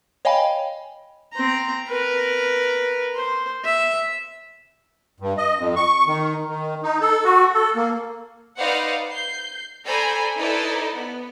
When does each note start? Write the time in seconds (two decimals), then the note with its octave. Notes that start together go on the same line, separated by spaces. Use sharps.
0.25 C#5 D#5 F5 G5 G#5 B5
1.33 C4 A#5
1.87 A#4 B4
3.15 C5
3.64 E5
5.20 G2
5.37 D#5
5.59 F2
5.76 C#6
6.07 D#3
6.49 D#3
6.83 D#4
7.01 A4
7.24 F#4
7.54 A4
7.75 A#3
8.57 D#4 B4 C5 D5 F5 F#5
9.09 G6 C7
9.86 A4 C5 D5 G#5 A#5 B5
10.39 D#4 E4 A4 B4 C5 D5
10.96 B3